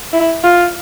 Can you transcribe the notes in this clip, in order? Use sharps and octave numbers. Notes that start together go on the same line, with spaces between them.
E4
F4